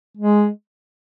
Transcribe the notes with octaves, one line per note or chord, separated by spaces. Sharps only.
G#3